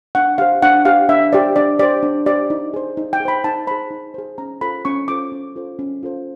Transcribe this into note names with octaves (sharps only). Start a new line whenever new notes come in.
D4 F#5
G4 C5 F5
D4 F#5
G4 C5 F5
D4 E5
G4 C5 D5
D4 D5
G4 C5 D5
D4
G4 C5 D5
D#4
G#4 C5
D#4
G5
G#4
C5 B5
D#4 A5
G#4 C5 B5
D#4
G#4 C5
C#4 A#5
F4 A4 C5 B5
C#4 C#6
F4 A4 C5 D6
C#4
F4 A4 C5
C#4
F4 A4 C5